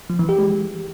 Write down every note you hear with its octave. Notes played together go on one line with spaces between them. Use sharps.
F3
E3
G4
G#3